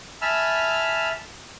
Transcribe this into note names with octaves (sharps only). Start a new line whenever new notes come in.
E5 G#5 A5 B5 E6 F6